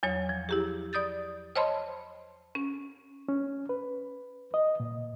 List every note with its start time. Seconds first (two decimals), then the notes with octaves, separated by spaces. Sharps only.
0.03 E2 F#3 C#5
0.29 F3
0.49 E4 G4 G#4
0.93 D5 D#6 G6 A6
1.56 C5 C#5 D#5 A5 B5 C6
2.55 C#4
3.29 C#4
3.69 B4
4.54 D#5
4.80 A#2